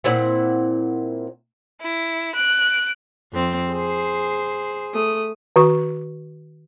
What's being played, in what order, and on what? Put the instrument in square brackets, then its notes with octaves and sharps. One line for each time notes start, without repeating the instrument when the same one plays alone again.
[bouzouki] A#2 C4 E4 F#5
[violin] E4
F#6 D7
[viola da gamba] F2 C4
G#4 C5
[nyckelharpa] A3 D#6
[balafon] D#3 F#4 C#6